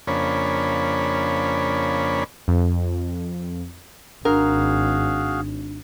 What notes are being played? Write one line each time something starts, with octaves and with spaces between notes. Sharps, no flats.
F2 C#3 A#3 D4 C#5 B5
F2
G#1 D4 F#4 G#4 A#4 F5